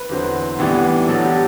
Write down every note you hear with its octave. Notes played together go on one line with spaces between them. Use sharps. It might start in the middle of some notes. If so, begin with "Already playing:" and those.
Already playing: B4
E2 D3 F#3 C4
A2 E3 G3 B3 D4
A2 F#3 B3 D4 A4
G4